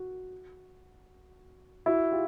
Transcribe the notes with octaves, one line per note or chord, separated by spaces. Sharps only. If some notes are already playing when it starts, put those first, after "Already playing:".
Already playing: F#4
E4 F#4
F4 G4